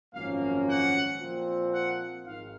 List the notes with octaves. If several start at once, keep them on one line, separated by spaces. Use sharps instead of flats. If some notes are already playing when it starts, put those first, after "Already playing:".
G#1 F#2 F3 A#3 C#4 F5
F#5
A#2 F3 C4
F#5
G#1 G#2 D#3 F5